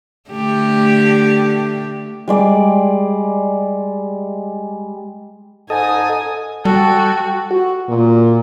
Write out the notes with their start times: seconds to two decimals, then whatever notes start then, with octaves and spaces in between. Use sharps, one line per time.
0.30 D3 A3 G4
2.28 G3 G#3 D5
5.70 G#2 A4 D#5 G#5 D#6
6.65 G3 F#4 A4 G5
7.51 F#4
7.89 A#2